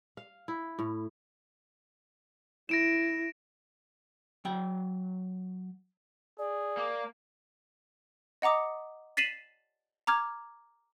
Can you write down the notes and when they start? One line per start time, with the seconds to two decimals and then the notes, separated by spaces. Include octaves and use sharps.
0.17 F5
0.48 E4
0.79 A2
2.69 E4 A#6 D7 E7
4.45 F#3 G5
6.39 G#4 D5
6.77 A#3 D6
8.42 D#5 F#5 A#5 D6 D#6
9.17 A6 B6 C7 D#7 E7 F#7
10.07 A#5 D6 F6 G#6